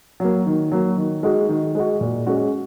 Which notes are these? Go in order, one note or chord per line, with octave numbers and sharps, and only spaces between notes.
F#3 A#3
D#3
F#3 A#3
D#3
G#3 D#4 F#4
D#3
G#3 D#4 F#4
A#2
G#3 C#4 F#4